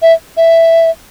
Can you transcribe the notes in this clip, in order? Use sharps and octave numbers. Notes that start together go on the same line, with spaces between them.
E5
E5